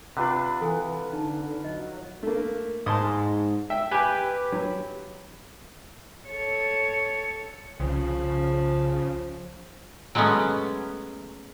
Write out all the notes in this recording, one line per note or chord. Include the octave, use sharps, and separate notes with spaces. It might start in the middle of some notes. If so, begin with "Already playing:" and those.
C3 D4 F4 B4 F#5
E3 A4 G#5
D3 D#4 A5
F#3 D#5
A3 A#3
G#2 A5 C6 D#6
E5 G5
G4 B4 G#5
F#3
A4 C#5
C2 C#3 F3
F#3 G#3 A3 B3 C#4